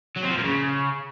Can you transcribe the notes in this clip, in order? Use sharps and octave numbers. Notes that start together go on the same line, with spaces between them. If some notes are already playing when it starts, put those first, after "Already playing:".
F#3
C4
F3
A#2
C#3